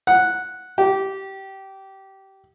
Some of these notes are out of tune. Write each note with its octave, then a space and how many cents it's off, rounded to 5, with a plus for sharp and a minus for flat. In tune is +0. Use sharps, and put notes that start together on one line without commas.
F#5 -5
G4 -20